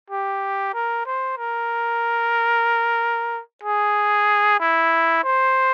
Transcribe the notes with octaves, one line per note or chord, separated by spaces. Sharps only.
G4
A#4
C5
A#4
G#4
E4
C5